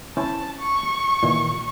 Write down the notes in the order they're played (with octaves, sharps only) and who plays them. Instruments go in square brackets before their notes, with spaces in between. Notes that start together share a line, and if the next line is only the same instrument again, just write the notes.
[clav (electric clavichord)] C#4 E4 C5 [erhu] A5
[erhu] C#6
[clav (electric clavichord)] A#2 D#3 E3